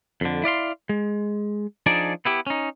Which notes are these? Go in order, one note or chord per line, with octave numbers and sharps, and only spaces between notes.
F2 D3
E4 D5 F5 C6
G#3
F3 D4 D#4 G#4 D5
B3 E4 G4
C#4 D#4